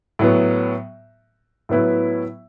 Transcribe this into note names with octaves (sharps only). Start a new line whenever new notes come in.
A2 F#3 B3
A2 F#3 B3 E4 B4